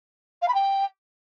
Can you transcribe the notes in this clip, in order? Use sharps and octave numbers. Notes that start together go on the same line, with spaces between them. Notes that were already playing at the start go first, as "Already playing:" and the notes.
F5
B5
G5